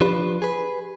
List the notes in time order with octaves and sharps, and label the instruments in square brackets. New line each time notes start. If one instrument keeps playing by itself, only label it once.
[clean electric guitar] F3 D4 B4 [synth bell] G4
[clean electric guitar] G#4 B4